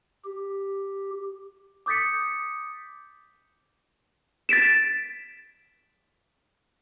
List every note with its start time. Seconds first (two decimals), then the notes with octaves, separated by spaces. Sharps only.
0.24 G4
1.86 D6 D#6 G6 A6 B6 C#7
4.49 A6 B6 D7 E7